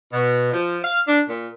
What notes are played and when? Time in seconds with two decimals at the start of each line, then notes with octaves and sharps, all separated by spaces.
0.12 B2
0.51 F3
0.82 F5
1.06 D4
1.27 A#2